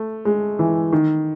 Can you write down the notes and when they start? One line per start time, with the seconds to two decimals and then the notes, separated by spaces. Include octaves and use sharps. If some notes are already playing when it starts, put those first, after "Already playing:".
Already playing: A3
0.25 G#3
0.59 E3
0.92 D#3